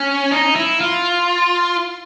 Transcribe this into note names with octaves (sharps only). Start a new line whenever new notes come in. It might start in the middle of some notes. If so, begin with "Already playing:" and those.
Already playing: C#4
D#4
E4
F4